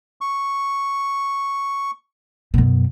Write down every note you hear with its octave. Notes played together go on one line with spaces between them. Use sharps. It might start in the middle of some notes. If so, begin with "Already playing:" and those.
C#6
F#2 B2